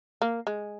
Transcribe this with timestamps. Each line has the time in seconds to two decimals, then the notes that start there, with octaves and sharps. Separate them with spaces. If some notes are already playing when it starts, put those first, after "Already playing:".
0.22 A#3
0.47 G#3